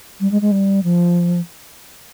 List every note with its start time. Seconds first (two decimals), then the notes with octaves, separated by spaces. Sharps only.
0.20 G3
0.31 G#3
0.42 G#3
0.52 G3
0.84 F3